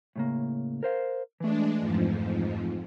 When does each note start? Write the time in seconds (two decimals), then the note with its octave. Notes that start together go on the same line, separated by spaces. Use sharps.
0.16 A2 C#3 A#3
0.83 A#4 C5 F5
1.40 E3 G#3 A3 D4
1.78 F2 G#2 F3